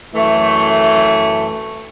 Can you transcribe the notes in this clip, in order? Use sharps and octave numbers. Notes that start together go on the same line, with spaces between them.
F#2 E3 A3